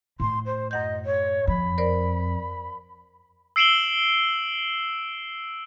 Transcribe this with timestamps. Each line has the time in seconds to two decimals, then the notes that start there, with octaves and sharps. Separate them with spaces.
0.20 A2 C6
0.45 C5
0.71 F#2 D#5 F#5 G6
1.05 C#5
1.47 F2 B5
1.78 A#4 C5 D5
3.56 E6 C7 D7 E7 F#7 G7